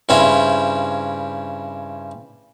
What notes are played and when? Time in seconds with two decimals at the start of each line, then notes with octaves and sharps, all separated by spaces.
0.09 G2 C#3 C4 E4 C#5 E5